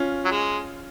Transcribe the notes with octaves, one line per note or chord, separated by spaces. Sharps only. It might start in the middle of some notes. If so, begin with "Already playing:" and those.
Already playing: C#4 F4
F#3
G#3